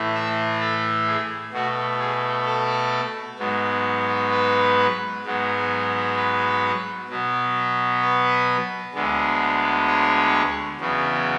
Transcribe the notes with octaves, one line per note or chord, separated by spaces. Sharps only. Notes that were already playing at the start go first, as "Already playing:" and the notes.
Already playing: A2 E3 A3
E5
A4
G#4
B2 A3 F#4
G#4
A4
G#2 F#3 B3
B4
G#2 F#3 B3
B4
B2 F#3 B3
B4
D2 D3 G#3 B3
C#5
E2 C#3 F#3 B3